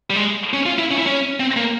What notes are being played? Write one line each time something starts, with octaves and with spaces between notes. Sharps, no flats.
G3
G#3
C#4
F4
E4
C#4
E4
C#4
C4
A#3